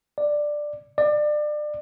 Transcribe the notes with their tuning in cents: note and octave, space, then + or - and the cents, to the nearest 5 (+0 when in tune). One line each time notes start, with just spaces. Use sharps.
D5 +10
D5 +30